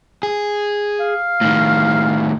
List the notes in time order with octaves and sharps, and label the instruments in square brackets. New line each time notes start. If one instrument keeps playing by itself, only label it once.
[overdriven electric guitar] G#4
[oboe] F5
[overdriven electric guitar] A2 D#3